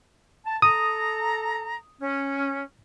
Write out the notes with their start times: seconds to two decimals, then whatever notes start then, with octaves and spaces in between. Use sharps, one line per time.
0.45 A5
0.62 A4 A5 A#5 D#6
2.01 C#4